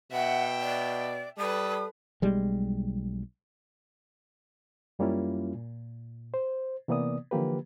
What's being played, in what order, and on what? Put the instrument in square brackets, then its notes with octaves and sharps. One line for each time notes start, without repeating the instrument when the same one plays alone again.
[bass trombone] B2 [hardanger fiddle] E5 G5 [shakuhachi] F#5
[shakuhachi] D5
[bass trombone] G3 [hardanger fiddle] A4 B4 [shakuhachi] D#6
[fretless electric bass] B1 G3 G#3
[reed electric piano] F#2 G3 A#3 C#4 E4 F4
A#2
C5
C3 E3 A#3 B3 D5 D#6
D3 E3 F3 A#3 G4 B4